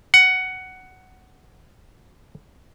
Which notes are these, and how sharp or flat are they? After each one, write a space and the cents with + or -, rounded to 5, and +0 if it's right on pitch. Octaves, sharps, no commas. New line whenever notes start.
F#5 +10